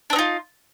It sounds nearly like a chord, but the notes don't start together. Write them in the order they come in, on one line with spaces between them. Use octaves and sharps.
D4 C4 D#4 F4